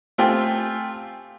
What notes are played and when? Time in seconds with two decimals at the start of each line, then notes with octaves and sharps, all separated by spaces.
0.18 A3 C4 F4 G4 G5 G#5